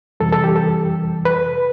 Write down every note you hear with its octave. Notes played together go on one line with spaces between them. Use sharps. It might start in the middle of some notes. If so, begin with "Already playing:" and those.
F2 C3 E3 G3 A4
A4
G4
A4
B4